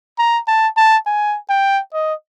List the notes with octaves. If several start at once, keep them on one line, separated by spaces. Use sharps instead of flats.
A#5
A5
A5
G#5
G5
D#5